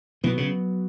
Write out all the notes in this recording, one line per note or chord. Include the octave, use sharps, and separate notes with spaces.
B2 E3 F#3 B3 F#4
C#3